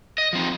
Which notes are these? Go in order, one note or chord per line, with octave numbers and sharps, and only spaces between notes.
D#5
F3 C4 D#4